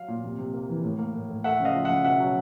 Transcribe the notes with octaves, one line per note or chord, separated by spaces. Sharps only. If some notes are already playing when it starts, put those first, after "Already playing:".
Already playing: F#3 F5
A#2
C3
C3
A#3
E3
A2
A#3
A2
A2
A3 E5 F#5
C#3
D#5 F5
F3
C#3 E5 F#5
B2 E5 F#5
F#3